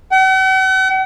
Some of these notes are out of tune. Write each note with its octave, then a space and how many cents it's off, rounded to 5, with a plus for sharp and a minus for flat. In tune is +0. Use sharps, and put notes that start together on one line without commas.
F#5 +45